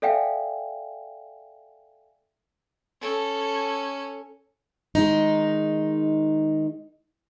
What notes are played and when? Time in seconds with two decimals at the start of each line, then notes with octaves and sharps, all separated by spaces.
0.02 A4 D5 E5 F5 G5 G#5
3.01 C#4 A4
4.95 D#3 G#3 D#4